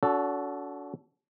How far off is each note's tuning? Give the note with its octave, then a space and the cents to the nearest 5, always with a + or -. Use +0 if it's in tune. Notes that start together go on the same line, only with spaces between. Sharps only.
D4 -45 F#4 -10 A4 +0